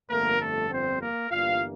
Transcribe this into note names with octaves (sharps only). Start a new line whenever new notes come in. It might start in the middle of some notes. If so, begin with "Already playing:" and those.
G1 F2 D3 A3 A#3 A#4
A3 A4
C4 C5
A#3 A#4
G1 G2 E3 G3 A#3 F4 F5